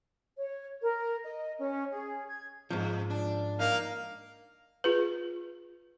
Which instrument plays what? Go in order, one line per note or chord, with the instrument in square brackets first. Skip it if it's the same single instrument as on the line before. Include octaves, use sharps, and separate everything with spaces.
[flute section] C#5
A#4
D#5
C#4
G#4
G#6
[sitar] F2 [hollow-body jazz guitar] G#2 F3
[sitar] D4
[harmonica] A#3 F5 [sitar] D#4
[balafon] F4 G#4 B4